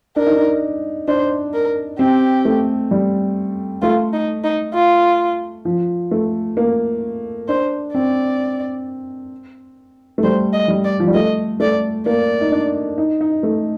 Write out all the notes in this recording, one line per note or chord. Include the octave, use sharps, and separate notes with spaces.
D4 A#4
D#4
D4
D4 C5
A#4
C4 G4
A3
G3
A3 F4
D#4
D#4
F4
F3
A3
A#3
D4 C5
C4 D5
A3
G3 C5
D#5
G3
D5
F3
G3
A3 D#5
A3 D5
A#3 D5
D#4
D4
D#4
D#4
A3